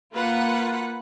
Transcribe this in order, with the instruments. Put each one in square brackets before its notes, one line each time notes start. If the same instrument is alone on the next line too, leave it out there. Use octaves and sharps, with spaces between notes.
[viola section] A#3 F4 B4 F#5